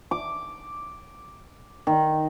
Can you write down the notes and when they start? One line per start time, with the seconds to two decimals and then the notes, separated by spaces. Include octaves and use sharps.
0.11 D6
1.87 D#3